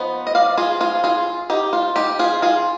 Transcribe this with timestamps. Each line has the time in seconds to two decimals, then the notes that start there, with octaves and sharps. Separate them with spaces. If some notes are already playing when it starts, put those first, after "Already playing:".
Already playing: F3 B3 D#4
0.27 D#5
0.35 D5 F5
0.57 F4 G#4
0.81 F4 G#4
1.04 F4 G#4
1.50 D#4 G4
1.73 F4
1.96 D#4 G4
2.19 F4 G#4
2.42 F4 G#4